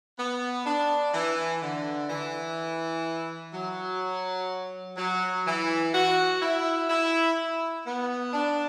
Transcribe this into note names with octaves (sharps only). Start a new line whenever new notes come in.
B3
D4
E3
D3
E3
F#3
F#3
E3
F#4
E4
E4
B3
D4